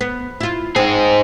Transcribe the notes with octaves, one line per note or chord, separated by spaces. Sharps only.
B3
E4 F4
C4 D#4 G#4